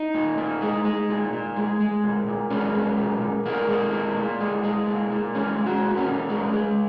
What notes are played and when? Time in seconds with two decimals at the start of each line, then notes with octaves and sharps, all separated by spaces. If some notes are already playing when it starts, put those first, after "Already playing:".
Already playing: D#4
0.14 A#2
0.38 A#2
0.61 G#3
0.85 G#3
1.09 A#2
1.33 A#2
1.56 G#3
1.80 G#3
2.04 A#2
2.27 A#2
2.50 G#3 C#4
2.75 G#3
2.98 A#2
3.21 A#2
3.45 G#3 A#3
3.68 G#3
3.93 A#2
4.17 A#2
4.40 G#3
4.64 G#3
4.87 A#2
5.10 A#2
5.35 G#3 C#4
5.58 G#3
5.66 F#4
5.82 A#2
5.90 A#3
5.97 C#4
6.05 A#2
6.30 G#3
6.53 G#3